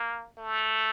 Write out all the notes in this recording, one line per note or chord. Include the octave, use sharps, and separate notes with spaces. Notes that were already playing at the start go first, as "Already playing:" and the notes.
Already playing: A#3
A3